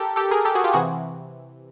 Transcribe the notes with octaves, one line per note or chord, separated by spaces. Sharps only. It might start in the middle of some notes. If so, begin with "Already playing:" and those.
Already playing: G4 A4 A#4
G4 A4
G#4 A#4
G4 A4
F#4 G#4
F4 G4
C3 E3 F#4 G#4